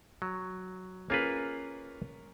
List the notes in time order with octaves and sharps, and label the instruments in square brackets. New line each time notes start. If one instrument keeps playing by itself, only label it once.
[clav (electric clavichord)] F#3
[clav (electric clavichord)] A#3 F4 B4 [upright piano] C#4 G#4 A#4